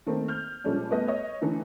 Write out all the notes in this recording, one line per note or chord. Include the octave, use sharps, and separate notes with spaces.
D#3 A3 A#3 C4
F6 G6
A#2 F3 G3 G#3 C#4 D4
G3 A3 B3 G#4 B4 D#5
C#5 D#5
D3 E3 A3 D#4